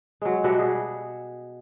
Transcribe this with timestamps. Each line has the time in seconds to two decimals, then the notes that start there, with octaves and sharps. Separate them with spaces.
0.22 F#3 G#3
0.44 B2 G3 F#4 E5
0.59 G#4